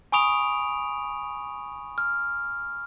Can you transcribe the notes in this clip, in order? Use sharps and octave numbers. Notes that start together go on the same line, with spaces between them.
G#5 B5 C#6 D#6 D7 F7
F6